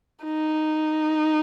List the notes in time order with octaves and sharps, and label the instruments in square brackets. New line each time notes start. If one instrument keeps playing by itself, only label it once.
[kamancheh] D#4